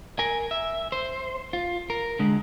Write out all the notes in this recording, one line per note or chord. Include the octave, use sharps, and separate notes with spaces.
A#4 G#5
E5
C5
F4
A#4
D3 G#3